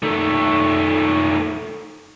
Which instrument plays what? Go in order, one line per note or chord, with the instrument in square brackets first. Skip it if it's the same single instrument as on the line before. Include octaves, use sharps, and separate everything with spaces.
[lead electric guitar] D#3 A3